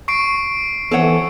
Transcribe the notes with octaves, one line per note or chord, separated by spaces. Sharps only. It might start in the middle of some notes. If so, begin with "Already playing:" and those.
C#6 C7 D7
E3 B3 C4 A4 C#5 F#5